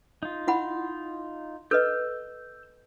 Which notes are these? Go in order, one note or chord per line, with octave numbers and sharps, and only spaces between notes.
D#4 F4
E4 F#5 B5
A4 B4 D#5 E6 G6